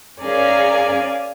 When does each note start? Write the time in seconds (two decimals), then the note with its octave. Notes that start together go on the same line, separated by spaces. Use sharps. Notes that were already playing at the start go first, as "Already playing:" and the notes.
0.22 C#4 G#4 A#4 D5 F5 G#5